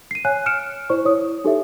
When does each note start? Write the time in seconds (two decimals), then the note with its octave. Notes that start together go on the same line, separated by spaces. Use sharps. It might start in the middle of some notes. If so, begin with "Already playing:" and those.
0.11 C7 D#7
0.25 C#5 F5 G#5 F#6
0.46 F6 C#7 D7 E7
0.90 E4 C5 D5 C#6
1.05 E4 C#5 D#6
1.45 D#4 G4 A4 B4 C#5 E5